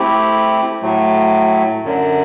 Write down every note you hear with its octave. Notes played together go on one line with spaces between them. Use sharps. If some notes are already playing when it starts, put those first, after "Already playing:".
Already playing: A3 C4 E4 G4
A2 F#3 A3
F#2 D3 F#3